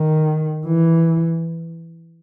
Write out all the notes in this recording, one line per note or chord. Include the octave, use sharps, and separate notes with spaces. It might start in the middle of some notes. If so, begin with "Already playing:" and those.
Already playing: D#3
E3